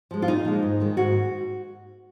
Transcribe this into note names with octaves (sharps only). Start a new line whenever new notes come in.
F3 G#3
F4
A#2 D#4
F3 G#3
G#2
D#3 G#3
G#2 F#4